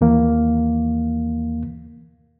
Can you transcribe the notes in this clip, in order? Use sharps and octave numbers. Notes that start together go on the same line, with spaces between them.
D#2 E3 A#3 F5